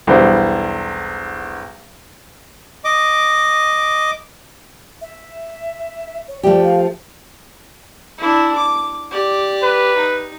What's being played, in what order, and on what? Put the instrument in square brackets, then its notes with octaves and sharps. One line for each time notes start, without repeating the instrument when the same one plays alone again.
[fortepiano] B1 E2 D3 G3 E4 C5
[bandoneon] D#5 D6
[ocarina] E5
C#5
[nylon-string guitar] F3 A3 G4 [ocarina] D5
[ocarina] F5
[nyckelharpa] D4 E4
D6
G4 D5
[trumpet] B4
[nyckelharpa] D#4